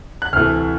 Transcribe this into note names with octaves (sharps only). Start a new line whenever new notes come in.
F#6
D2 C3 E3 A3 F6